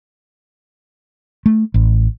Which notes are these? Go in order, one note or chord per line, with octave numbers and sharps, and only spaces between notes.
A3
A1